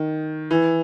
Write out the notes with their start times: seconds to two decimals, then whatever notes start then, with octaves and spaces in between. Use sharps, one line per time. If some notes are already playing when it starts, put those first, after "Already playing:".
Already playing: D#3
0.51 E3